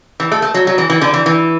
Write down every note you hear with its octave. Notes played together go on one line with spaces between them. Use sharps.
E3
A3
A3
F#3
F#3
E3
E3
D3
E3
E3